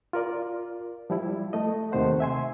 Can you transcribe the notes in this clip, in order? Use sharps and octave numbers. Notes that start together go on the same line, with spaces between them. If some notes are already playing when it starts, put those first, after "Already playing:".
F4 A#4 D5
F3 G3 E4
A3 D#5
D#2 C3 D#3 A3 C5 F#5
E5 G#5 C6